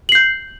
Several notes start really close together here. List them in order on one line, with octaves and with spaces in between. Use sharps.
F#7 C7 G6